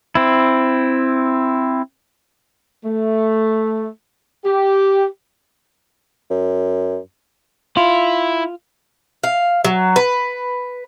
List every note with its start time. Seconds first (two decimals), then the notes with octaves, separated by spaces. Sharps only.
0.15 C4 E4
2.85 A3
4.45 G4
6.30 F#2
7.77 E4 F4
9.23 F5
9.65 F#3
9.96 B4